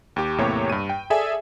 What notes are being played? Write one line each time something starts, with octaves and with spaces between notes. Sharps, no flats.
D#2 G4
E2 A2 C3 A#3 G4 C#5
G2 D#7
G5
G#4 A4 D5 E5 G#5